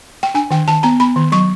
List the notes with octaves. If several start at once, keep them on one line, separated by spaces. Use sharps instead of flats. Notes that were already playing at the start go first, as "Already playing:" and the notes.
G5
D4 G#5
D#3 G5
D#3 A5
B3 A#5
B3 B5
D#3
F#3 C#6